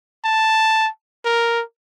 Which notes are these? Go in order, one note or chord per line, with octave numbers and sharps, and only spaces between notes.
A5
A#4